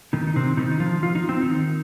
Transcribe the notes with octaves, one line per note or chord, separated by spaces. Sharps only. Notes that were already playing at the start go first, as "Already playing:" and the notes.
D#3 D#4
D#4
C3 C4
D#3 D#4
D#4
F3 F4
F4
D#4
C4
D#3 D#4